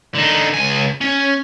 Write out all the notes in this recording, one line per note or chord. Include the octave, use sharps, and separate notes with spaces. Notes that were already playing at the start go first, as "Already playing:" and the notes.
D3 D#4
C#2 G#5
C#4